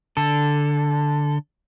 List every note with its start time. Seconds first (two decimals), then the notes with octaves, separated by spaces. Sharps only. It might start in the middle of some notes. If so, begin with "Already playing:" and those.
0.17 D3 A4